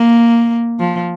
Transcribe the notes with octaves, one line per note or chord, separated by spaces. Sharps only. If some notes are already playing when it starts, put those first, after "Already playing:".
Already playing: A#3
F3